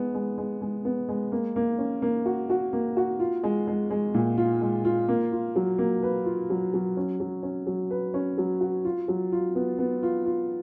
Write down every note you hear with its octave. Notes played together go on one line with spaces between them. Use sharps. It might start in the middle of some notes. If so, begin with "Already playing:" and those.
Already playing: G#3 B3
G#3
G#3
G#3
B3
G#3
A#3
A#3
C#4
A#3
F#4
F#4
A#3
F#4
F4
G#3
G#3
G#3
A#2
F4
G#3
F4
A#3
F4
F#3
A#3
B4
F4
F#3
F#3
C#4
F#3
C#4
F#3
B4
C#4
F#3
F#4
F4
F#3
F4
B3
B3
F4
F4